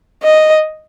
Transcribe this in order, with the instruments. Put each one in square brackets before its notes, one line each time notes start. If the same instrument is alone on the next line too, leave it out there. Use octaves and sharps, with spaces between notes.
[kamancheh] D#5